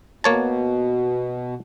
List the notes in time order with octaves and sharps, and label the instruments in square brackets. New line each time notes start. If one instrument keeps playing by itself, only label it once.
[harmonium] B2 [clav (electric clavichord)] A#3 C#5 A5